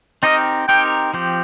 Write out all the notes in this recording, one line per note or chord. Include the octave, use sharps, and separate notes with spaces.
C4 D#4 G4 A#4 D#5
C4 D#4 G4 A#4 G5
F3 C4 G4